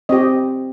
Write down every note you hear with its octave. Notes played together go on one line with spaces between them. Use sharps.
C4 G4 D#5